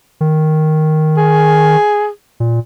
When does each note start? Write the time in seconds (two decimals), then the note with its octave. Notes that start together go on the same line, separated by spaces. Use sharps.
0.21 D#3
1.17 G#4
2.40 A#2